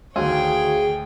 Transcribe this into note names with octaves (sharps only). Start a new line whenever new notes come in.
D2 D#3 F#4 G#4 C#5 F5 G5